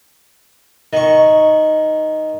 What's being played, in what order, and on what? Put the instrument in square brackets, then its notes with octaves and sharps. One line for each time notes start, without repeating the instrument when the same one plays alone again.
[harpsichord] D#3 C#6